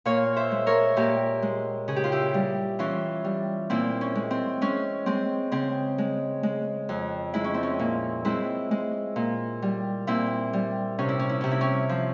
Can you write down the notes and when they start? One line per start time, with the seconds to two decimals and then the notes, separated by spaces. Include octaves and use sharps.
0.05 A#2 C#5 F5
0.36 C5 E5
0.51 G#3
0.67 A#4 C#5
0.96 A#2 G4 A#4
1.42 G#3
1.88 C#3 G#4
1.96 G4
2.04 F4
2.12 E4 G4
2.34 G3
2.79 E3 C#4 F4
3.24 G3
3.70 A#2 C4 E4
4.01 C#4
4.15 G#3
4.31 C4
4.61 G#3 C#4
5.06 G#3 C4
5.52 C#3 C4
5.98 G#3
6.43 G#3
6.89 F2
7.34 G#3 E4
7.44 C#4
7.54 C4
7.63 C#4
7.79 A#2
8.25 G#3 C4 E4
8.71 G#3
9.16 A#2
9.62 G3
10.07 A#2 C4 E4
10.53 G3
10.99 C3 C#4
11.09 E4
11.19 C#4
11.29 E4
11.41 C3 C#4
11.51 E4
11.61 C#4
11.89 F3